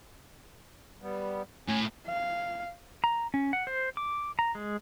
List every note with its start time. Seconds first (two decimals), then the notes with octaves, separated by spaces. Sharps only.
1.02 G3 B3
1.68 A2 C#4 G#5
2.07 F5
3.04 A#5
3.34 C#4
3.53 F#5
3.67 C5
3.97 D6
4.39 A#5
4.55 G#3